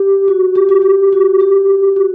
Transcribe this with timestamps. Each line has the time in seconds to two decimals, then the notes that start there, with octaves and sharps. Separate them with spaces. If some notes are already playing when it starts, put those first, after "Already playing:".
Already playing: G4
0.28 F#4
0.55 G4
0.69 F#4
0.82 G4
1.13 F#4
1.40 G4
1.96 F#4